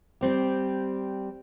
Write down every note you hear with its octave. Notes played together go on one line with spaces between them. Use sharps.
G3 C4 G4